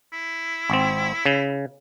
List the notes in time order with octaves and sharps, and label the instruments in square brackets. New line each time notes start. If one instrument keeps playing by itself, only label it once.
[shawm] E4
[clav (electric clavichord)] G#1 C4
C#3